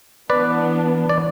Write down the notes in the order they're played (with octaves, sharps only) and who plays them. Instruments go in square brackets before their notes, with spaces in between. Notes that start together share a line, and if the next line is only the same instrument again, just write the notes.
[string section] E3 B3 D4 [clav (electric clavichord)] B4 D5
[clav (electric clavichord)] D5